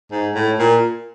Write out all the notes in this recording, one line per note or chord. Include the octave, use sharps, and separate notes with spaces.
G#2
A2
A#2